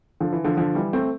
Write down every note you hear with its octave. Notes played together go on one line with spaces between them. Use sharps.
D3 F3
E3
D3 F3
D3 F3
E3 G3
A3 C4